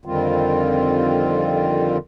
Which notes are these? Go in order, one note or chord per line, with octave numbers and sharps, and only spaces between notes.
F2 D3 D#3 G3 C4 F4